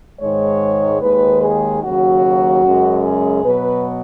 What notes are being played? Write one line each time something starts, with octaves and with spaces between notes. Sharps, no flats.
G#2 D#3 G#3 C#5
D#2 D#3 G#3 B4
G#4
D#2 C#3 F#3 F#4
F#2 C#3 G#3
G#4
B2 F#3 B4